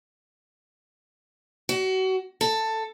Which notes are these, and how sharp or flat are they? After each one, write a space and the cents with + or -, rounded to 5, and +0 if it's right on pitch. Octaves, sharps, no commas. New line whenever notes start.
F#4 +30
A4 +10